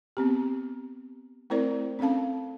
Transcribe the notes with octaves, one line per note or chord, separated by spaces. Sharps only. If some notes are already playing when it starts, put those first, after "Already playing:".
B3 C4 G4
A3 C4 E4 A#4 C5 D5
C4 C#4 A4 F5 A5